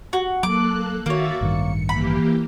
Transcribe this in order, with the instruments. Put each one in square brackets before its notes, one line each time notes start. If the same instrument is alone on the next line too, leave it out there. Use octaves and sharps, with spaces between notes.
[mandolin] F#4
[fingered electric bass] F#3 [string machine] A#3 A4 F#6 [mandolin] D6
[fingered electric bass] D#3 [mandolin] A#3 C#5 [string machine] F#4 E5 A6
[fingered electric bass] A1 G2 D#3 [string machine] C#7
[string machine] E3 A#3 G4 [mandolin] B5